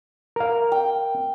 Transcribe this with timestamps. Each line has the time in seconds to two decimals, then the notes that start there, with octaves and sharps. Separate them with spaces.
0.36 A#4 F5
0.72 G5